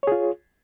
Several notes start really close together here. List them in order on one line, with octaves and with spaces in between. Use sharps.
C#5 G#4 F4